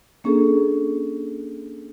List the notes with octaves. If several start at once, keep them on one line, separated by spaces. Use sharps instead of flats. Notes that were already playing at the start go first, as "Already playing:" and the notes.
A#3 C#4 D4 G#4 A4